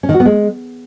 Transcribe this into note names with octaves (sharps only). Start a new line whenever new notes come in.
C#4
D#3
F#4
B3
G#3